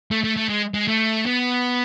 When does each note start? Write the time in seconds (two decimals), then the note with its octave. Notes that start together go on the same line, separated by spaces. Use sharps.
0.11 A3
0.24 A3
0.36 A3
0.49 G#3
0.74 G#3
0.88 A3
1.26 B3